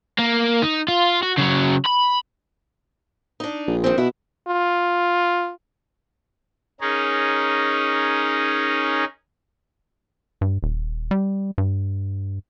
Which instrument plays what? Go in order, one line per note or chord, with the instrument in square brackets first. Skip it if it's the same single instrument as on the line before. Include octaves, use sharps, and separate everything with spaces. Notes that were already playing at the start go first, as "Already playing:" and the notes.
[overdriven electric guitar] A#3
D#4
F4
F#4
C#3 F#3
B5
[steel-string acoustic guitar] D4 D#4
[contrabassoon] A#1
[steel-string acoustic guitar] D#3 C4
[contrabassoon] B2 [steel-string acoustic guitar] E4 E5 F#5
[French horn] F4
[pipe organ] C#4 D#4 G#4 A#4
[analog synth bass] G2
D#1
G3
G2